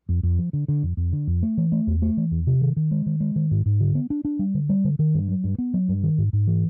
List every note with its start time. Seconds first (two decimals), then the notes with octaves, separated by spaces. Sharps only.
0.09 F2
0.23 F2
0.39 F3
0.53 D3
0.68 D3
0.83 F2
0.97 F2
1.12 D3
1.27 F2
1.43 A3
1.58 E3
1.72 A3
1.87 E2
2.02 A3
2.17 E3
2.31 E2
2.47 C3
2.61 D#3
2.76 D#3
2.91 G#3
3.06 D#3
3.20 G#3
3.36 D#3
3.51 G#2
3.66 G#2
3.80 D3
3.95 B3
4.10 D4
4.25 D4
4.39 G3
4.54 D3
4.69 G3
4.84 D3
4.99 D#3
5.14 G2
5.28 F#3
5.44 G2
5.58 B3
5.74 F#3
5.89 G2
6.03 D#3
6.18 G#2
6.33 G#2
6.47 E3